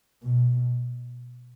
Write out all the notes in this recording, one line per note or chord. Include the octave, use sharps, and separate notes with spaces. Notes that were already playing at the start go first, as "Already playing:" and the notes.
B2